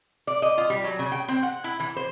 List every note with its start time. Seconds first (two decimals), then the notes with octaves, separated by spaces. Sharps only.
0.27 D5
0.42 D#5
0.58 F4
0.70 G3
0.84 F#3
0.99 C#3
1.12 G5
1.28 C4
1.43 F#5
1.64 E4
1.80 E3
1.96 C5